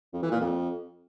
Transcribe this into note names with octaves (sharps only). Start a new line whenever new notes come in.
F2
E3
A#2
F2